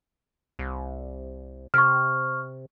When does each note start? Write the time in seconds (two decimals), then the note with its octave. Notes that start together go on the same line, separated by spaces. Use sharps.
0.59 C2
1.74 C3 C#6 F6